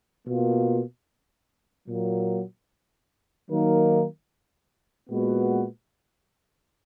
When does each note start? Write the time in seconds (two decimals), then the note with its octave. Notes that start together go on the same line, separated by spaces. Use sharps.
0.25 B2 A#3 F4
1.86 A#2 F#3 A#3
3.48 D#3 F#3 A#3 D#4 A#4
5.09 A#2 G#3 B3 F#4 B4